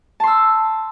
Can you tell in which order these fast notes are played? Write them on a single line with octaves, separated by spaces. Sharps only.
A5 C6 E6